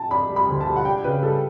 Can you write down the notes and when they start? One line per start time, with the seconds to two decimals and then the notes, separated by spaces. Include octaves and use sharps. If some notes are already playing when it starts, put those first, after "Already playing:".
Already playing: G5 A5
0.11 D4 B5
0.29 G3
0.36 B5
0.48 D2
0.61 A5
0.66 G3
0.76 F#5
0.85 D4 G5
1.04 C#3 B4
1.22 G3 A4